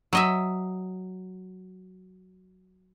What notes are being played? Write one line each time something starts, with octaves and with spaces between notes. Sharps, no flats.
F#3 D#5 E5